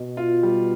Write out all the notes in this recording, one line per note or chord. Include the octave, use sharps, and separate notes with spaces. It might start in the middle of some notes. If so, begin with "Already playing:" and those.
Already playing: B2
F4
G3